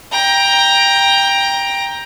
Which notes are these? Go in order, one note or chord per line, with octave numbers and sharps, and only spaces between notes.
G5 A#5